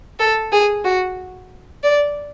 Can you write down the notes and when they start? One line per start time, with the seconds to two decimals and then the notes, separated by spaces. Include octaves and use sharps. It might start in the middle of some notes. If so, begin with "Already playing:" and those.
0.19 A4
0.52 G#4
0.84 F#4
1.84 D5